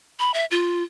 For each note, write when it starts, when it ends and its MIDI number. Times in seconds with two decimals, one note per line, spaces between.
0.19 0.33 83
0.34 0.45 76
0.51 0.83 65